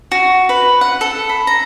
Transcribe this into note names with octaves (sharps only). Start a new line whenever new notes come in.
F#4
B4
F#5
A4
B5
A#5